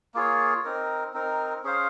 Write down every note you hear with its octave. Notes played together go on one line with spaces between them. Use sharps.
A#3 F4 G#4 C#5
C4 D#4 A#4
C4 D#4 A#4
C#4 G#4 C5 F5